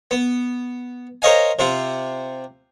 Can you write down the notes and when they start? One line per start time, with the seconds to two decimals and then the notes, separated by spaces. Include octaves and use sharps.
0.11 B3
1.22 A#4 C5 C#5 D#5 F5 G#5
1.59 C3 C4 F4